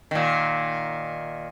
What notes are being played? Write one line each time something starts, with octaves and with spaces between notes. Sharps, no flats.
A#2 D#3